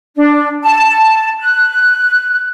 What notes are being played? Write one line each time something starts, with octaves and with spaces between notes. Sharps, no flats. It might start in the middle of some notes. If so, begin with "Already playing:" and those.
D4
A5
F#6